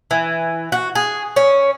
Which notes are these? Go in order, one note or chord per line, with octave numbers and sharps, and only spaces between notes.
E3
F#4
G#4
C#4